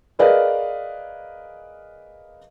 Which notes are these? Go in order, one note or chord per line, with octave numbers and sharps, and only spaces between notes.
G#4 A#4 B4 D5 D#5 F5